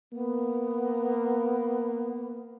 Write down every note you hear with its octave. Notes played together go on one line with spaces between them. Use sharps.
A#3 B3